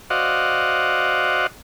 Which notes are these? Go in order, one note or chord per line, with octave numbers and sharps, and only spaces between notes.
F#4 C5 D5 D#5 F5 F#5